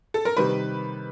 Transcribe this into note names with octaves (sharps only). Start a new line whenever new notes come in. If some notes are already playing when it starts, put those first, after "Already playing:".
A4
A#4
C3 D#3 G3 B4